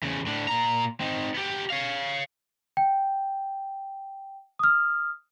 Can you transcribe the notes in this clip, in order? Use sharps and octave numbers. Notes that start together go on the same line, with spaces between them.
E2 C#3
A2 D4
A#2 A#5
C4 D#4
B3 G4
C#5 F5
G5
D#6 F6